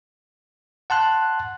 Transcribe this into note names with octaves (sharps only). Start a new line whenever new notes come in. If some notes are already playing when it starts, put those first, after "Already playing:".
F#5 A5 C6 F#6